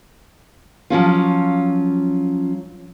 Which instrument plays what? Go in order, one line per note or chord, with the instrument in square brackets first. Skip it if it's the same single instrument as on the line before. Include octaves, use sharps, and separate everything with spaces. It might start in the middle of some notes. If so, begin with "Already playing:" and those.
[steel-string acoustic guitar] F3 F#3 C#4 F4